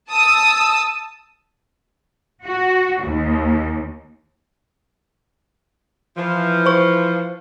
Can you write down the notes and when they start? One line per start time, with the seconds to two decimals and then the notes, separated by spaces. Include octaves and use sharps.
0.11 A5 D#6 E6
2.45 F#4
3.03 D#2
6.17 E3 F3
6.66 C5 C#6